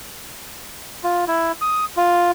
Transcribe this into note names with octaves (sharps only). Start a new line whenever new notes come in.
F4
E4
D#6
F4